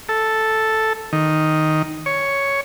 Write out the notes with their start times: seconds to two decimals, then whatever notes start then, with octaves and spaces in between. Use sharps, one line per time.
0.09 A4
1.13 D#3
2.06 C#5